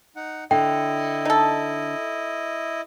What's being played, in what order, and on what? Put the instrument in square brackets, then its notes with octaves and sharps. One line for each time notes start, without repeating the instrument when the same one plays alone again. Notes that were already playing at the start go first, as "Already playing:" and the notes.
[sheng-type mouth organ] D#4 F#5
[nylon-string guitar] D3 [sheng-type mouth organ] E4 D#5 [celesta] G5
[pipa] D#4 A4